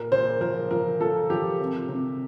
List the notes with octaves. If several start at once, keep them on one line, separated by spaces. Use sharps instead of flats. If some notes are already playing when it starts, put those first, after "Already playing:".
Already playing: A#2 A#4
A#2 C5
F3 A#4
F3 A#4
F3 A4
F3 G4
C3
C3